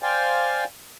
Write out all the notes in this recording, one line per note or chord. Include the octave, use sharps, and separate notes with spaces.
C5 D5 F5 G5 G#5